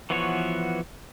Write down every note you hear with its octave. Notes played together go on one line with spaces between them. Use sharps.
E3 F3 B3 F#4 C#5